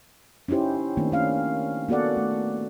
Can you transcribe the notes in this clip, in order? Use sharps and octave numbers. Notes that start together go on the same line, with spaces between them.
C#4 D#4 E4 G4 C5
D#3 A3 A#3 C4 D4
C#4 F5
A#3 B3 F#4 A4 D5 F#5
A3